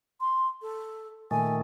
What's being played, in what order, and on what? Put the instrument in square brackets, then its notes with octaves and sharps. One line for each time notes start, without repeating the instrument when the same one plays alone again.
[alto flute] C6
A4
[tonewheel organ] A#2 D#3 A3 [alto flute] G#5